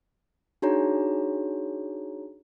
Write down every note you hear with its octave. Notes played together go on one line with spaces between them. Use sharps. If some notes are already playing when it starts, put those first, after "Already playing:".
D4 D#4 F#4 G#4 C#5 A#5